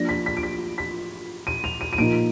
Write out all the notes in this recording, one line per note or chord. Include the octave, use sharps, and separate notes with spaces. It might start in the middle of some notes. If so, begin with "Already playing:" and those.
Already playing: F3 A#3 D4 A#6
B6
B6
D7
B6
B6
D#7
F7
D#7
D#7
A#2 F3 A#3 D#4 D7